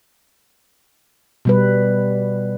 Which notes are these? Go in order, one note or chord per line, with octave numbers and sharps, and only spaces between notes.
B2 G3 B4